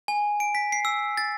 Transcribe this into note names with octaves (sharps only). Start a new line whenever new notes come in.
G#5
D7
B6
C7
E6
A6